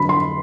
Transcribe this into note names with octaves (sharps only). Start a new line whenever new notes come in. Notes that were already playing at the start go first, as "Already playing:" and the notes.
Already playing: F2 D3 F#3 B5
C6